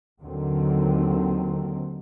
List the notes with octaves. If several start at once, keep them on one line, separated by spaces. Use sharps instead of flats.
D#2 D3 D#3 F#3 C4